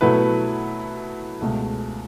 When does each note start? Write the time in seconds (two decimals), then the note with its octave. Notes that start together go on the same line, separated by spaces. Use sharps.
0.01 B2 F#3 A3 E4 B4
1.41 C#2 B2 A3